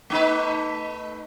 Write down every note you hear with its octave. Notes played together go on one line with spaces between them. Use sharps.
A3 D#4 B4